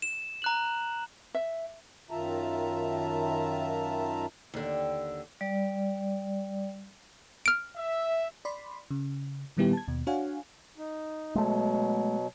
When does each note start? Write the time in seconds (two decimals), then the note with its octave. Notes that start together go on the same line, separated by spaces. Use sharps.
0.02 E7
0.42 A#5 F#6 F#7
1.34 E5
2.11 F#2 D#3 F4 E5 A5 A#5
4.54 D#2 D3
5.41 G3 D5
7.46 F6 D7
7.76 E5
8.45 D5 B5 C6
8.91 C#3
9.57 A#2 D#3 G3 B3 E4 G4
9.73 A5 G#6
9.88 D#2 B2
10.07 D4 F#4 C#5 F5 F#5 G#5
10.78 D#4
11.35 B2 F#3 G#3 A3